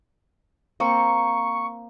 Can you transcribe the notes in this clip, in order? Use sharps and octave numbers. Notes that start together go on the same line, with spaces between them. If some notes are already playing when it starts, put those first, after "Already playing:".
A#3 C4 C#6